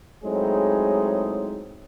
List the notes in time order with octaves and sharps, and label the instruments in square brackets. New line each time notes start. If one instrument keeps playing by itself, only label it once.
[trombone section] A2 F#3 G#3 C4 D#4 G#4